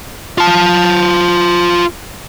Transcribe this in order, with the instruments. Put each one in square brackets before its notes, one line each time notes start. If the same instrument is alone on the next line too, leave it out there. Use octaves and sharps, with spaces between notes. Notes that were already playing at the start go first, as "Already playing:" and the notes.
[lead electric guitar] F4 A5